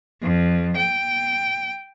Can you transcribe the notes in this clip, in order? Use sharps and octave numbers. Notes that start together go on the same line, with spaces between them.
F2
G5